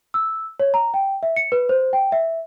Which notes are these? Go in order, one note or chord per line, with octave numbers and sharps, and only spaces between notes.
E6
C#5
A#5
G5
E5
C#7
B4
C5
G5
E5